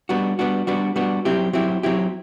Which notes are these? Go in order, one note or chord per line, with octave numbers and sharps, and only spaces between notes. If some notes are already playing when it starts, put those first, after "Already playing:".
G3 B3 D4 F#4
G3 B3 D4 F#4
G3 B3 D4 F#4
G3 B3 D4 F#4
F#3 C4 E4 G4
F#3 C4 E4 G4
F#3 C4 E4 G4